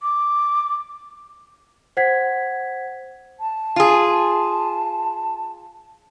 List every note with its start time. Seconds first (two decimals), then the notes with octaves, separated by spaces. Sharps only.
0.02 D6
1.97 C5 F#5 G#6 B6
3.39 A5
3.76 F4 G#4